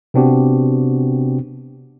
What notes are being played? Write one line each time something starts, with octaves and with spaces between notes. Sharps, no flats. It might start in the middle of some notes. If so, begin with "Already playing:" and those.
C3 B3 C4 D4 F#4 G4